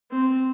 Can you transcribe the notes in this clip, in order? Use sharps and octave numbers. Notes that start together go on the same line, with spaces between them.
C4